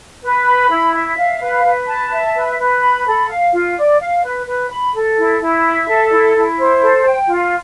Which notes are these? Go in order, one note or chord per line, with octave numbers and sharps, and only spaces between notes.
B4
B5
E4
E5
F5
B4
B4
A5
E5
B4
B4
B5
A4
F5
F4
D5
F5
B4
B4
B5
A4
E4
E4
E5
A4
E4
E4
C5
A4
G5
F4